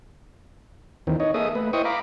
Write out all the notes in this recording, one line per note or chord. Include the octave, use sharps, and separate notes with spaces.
D#2 D#3 E3 C4
D#4 C#5 D#5
A#3 G#4 A4 D#5 E5 D#6
A3 B4
E4 C5 D#5 G5 C#6 D#6
F5 A#5 B5 D6